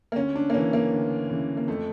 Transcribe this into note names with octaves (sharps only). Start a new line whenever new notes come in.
A#3
D2 C#4
D4
A#3
C#3 E3 C#4
A#3
D2
C#3 E3
A#3
F2 A3